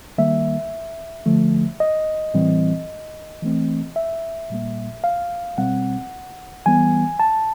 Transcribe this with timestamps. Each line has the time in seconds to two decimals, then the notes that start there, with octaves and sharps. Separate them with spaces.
0.18 D#3 G3 A#3 E5
1.26 D3 F3 A3
1.80 D#5
2.34 A2 E3 G3 C4
3.42 E3 A3 C4
3.96 E5
4.50 A#2 G3 A#3
5.04 F5
5.58 B2 G3 C4 F#5
6.66 E3 G3 B3 G#5
7.20 A5